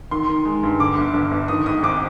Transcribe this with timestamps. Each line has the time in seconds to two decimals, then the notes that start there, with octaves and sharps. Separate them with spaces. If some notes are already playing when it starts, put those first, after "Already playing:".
0.11 D#3 C6
0.28 D#3
0.45 G#3
0.63 G2
0.79 D3 D6
0.98 G1
1.14 G1
1.31 G1
1.48 D#3 D#6
1.66 G#2 D#6
1.83 G#1 D6